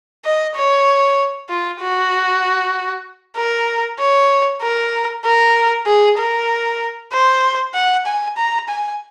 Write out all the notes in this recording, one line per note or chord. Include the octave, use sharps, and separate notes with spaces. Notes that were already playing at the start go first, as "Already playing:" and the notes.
D#5
C#5
F4
F#4
A#4
C#5
A#4
A#4
G#4
A#4
C5
F#5
G#5
A#5
G#5